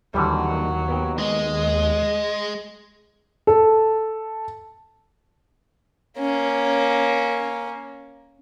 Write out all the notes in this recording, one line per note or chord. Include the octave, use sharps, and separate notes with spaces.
D#2 D3 E3 F#3 G3
B3 A#4 G5
G#3 D#5
A4
A#3 C#4